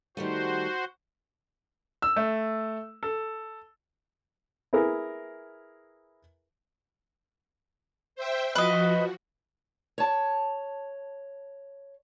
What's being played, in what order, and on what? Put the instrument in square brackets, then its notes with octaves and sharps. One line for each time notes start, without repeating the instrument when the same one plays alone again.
[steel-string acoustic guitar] D#3 G3 A3 [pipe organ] F#4 C5
[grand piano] E6
A3
A4
[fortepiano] E4 G#4 A#4 B4
[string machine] C5 E5 G5
[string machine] F3 F#4 [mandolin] B4 D#5
[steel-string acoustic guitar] C#5 A5